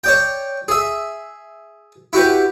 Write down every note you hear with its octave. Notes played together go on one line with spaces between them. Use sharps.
C#5 D5 G5
G#4 E5
E4 F#4 G4 B4